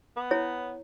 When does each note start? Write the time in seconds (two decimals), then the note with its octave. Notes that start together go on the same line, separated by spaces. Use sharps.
0.16 B3
0.31 E4 C#5